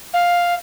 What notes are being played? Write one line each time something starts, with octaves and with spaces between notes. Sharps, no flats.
F5